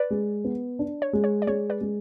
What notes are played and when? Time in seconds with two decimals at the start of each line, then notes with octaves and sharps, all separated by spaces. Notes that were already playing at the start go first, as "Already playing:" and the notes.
Already playing: B4 D5
0.10 G#3
0.44 B3
0.79 D4
1.02 C#5
1.13 G#3
1.24 C#5
1.42 D5
1.47 G#3 C#5
1.70 B4 D5
1.81 G#3